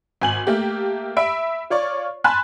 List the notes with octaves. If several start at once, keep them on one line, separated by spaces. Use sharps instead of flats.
G#1 G#5 F#7
A3 A#3 G4
E5 B5 D7
F4 C#5 D5 C#6
G#5 A5 B5 C6 F#6